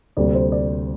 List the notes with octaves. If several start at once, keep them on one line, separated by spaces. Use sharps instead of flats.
D2 C3 G3 A#3 D5
C5
D5